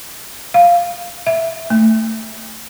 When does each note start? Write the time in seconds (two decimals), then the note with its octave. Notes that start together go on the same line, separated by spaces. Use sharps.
0.54 F5
1.27 E5
1.70 A3